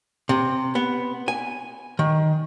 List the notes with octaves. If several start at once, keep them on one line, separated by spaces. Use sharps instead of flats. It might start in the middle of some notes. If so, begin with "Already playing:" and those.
C3
B3
G#5
D#3